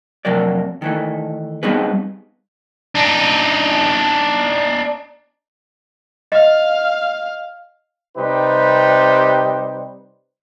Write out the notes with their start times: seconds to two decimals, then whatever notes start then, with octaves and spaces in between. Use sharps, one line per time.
0.25 F2 C3 F#3 A#4 D5
0.82 D#3 E3 A3
1.63 G3 B3 C4 D#4 G#4 B4
2.95 D4 D#4
6.32 D#5 F5
8.16 C3 G3 D#4 G4 B4 C5